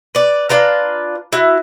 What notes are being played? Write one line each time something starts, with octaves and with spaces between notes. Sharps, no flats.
B4 D5
D4 F4 B4 A#5
E4 F#4